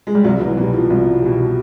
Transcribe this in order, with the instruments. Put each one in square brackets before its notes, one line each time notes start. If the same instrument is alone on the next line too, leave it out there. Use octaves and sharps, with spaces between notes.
[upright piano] G#3
G3
[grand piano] C2 [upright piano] F#3
[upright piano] E3
[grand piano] B2 [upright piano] E3
[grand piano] G3
[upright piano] F3
[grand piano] C2
B2 G3